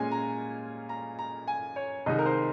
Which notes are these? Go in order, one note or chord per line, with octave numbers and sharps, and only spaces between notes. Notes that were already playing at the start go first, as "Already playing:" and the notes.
Already playing: A#2 G#3 C#4 F4 G#5
A#5
A#5
A#5
G#5
C#5
C2 C3 D#3 G#3 D#4 D#5
A#4
C5